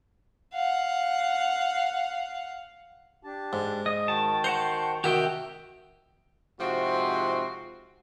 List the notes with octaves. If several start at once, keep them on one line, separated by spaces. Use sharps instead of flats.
F5 F#5
D4 G4 A5
G#2
D#5
D#3 F#4 G5 A5
C5 F#5 A5 A#5
C3 D#3 F#4 G4 E5 G5
G#2 C3 F3 C4 F#4